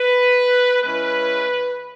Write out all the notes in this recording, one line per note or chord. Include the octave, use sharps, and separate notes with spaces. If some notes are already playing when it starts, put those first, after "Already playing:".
Already playing: B4
C#3 G#3 C#4 E4 B4